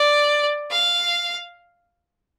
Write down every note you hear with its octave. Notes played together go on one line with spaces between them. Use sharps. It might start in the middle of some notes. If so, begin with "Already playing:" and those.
Already playing: D5
F5